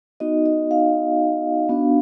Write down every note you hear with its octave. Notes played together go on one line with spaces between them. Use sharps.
B3 D#4 F#4 D#5
D#5
F5
B3 D4 F#4